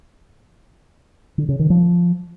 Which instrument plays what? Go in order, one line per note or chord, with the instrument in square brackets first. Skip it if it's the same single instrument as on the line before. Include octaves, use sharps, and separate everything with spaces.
[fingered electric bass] D3
C#3
D#3
F3